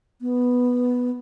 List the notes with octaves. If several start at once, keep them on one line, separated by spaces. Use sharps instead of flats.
B3